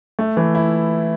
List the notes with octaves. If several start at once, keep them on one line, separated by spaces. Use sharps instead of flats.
A3
E3
E4